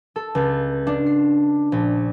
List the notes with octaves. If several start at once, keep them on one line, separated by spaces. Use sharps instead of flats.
A4
C#2
D4
C7
A#1